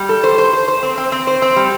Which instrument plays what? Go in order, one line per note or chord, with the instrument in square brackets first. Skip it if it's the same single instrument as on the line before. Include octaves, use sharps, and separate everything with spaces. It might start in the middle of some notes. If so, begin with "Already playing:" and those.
Already playing: [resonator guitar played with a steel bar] G3
A4
C5
C5
C5
C5
C4
C4
C4
C5
C4
G3